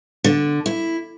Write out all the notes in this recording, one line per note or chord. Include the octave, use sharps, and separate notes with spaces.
D3
E4